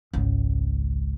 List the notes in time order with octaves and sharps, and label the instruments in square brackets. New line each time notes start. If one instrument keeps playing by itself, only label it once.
[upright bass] G#1 C#2